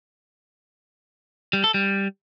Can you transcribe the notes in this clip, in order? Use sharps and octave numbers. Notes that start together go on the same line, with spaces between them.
G3
A4
G3